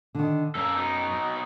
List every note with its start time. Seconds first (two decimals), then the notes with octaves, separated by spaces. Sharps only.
0.15 D3 D#3
0.55 F#2 A#3 A4
0.76 B2 D#4